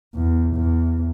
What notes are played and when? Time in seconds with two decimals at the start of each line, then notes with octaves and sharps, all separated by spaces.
0.15 E2
0.55 E2